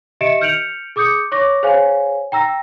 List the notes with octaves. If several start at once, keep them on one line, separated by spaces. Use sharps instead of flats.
G4 D#5 E5 C#7 D7 E7
F6 G6 C#7 D7 F7 F#7
G#4 D6 D#6 G6 C#7
C#5 C#6 D6 A#6
G#4 C5 C#5 F5 G#5
G5 A#5 E6 A#6